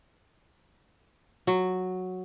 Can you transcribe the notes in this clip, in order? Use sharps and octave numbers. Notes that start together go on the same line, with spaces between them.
F#3